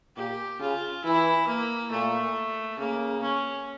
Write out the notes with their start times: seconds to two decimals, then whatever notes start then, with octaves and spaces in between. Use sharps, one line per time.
0.16 A#2 G4
0.60 C#3 F4
1.05 E3 E4
1.47 A#3
1.91 A#2 A3
2.78 C#3 A#3
3.22 C#4